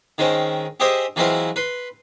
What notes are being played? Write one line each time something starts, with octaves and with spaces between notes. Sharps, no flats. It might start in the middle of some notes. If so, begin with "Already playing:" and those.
D#3 G#3 C4 C#4
G4 G#4 C5 D#5 E5
E3 F#3 G#3 C4 E4 F4
B4 C6